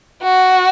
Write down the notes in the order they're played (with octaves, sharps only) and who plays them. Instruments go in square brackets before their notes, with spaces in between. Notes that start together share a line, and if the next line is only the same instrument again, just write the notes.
[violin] F#4